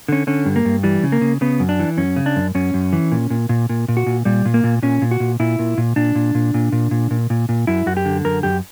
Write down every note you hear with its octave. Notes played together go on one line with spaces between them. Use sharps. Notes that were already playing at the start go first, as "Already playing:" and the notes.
D3 C#4
D3 C#4
G2
A#3
G2
E3 G3
C#3
A#3
C#3
C#3 B3
F#2
D4
E3
F#2 C#4
C#3
D4
F#2
F#2 C#4
F#2
E3
A#2
A#2
A#2
A#2
A#2
F#4
A#2
A#2 G3
A#2
A#3
A#2
A#2 C#4
A#2
F#4
A#2
A#2 E4
A#2
A#2
A#2 D4
A#2
A#2
A#2
A#2
A#2
A#2
A#2
A#2
F#2 E4
F#2 F#4
G4
D3
F#2 A#4
F#2 G4